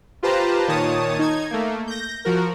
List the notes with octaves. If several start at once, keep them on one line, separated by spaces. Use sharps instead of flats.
F4 G4 B4 C5 A5 A#5
A#2 D#3 C#5 A5 D#6
D#4 G#6
A3 A#3
G6 A#6
F3 F#4 A#4